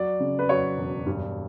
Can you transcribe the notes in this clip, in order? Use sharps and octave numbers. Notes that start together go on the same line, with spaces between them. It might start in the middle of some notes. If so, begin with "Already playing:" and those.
Already playing: F#3 D5
C#3
B4
F#3 C#5
E1
G2